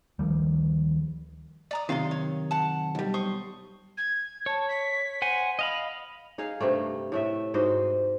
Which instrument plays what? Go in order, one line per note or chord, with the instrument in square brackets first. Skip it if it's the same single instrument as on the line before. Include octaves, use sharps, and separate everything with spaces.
[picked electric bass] D2 D#3 F3 G3
[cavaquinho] D5 A#5 D#6
[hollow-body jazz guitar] F#2 C3 D#3 [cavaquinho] F5 C6
[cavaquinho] C#5
F#5 A5
[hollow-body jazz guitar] B1 G3
[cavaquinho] C5 C#6 D#6
[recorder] G#6
[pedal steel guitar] C#5 [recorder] A5
[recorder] B6
[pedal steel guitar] C5 F#5 G#5
[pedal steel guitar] D#5 F5 B5 [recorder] A#6
[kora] D#4 G#4 F5
G2 C3 G3 A3
A2 A3 E5
G#2 F#4 C5 D#5